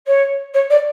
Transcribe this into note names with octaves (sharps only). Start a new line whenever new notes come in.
C#5
C#5
D5